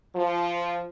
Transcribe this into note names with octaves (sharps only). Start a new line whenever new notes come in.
F3